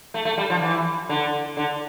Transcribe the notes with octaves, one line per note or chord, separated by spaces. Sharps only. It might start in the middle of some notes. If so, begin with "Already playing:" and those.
A3
A3
G3
F3
E3
D3
D3